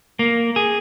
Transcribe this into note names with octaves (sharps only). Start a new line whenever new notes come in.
A#3
G#4